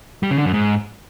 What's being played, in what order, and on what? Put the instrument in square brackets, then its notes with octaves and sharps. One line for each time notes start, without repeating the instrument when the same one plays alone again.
[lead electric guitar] G3
C#3
D3
F#2
G#2